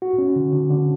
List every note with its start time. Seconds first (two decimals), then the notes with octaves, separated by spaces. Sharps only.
0.02 F#4
0.18 C#4
0.36 D3
0.53 D3
0.71 D3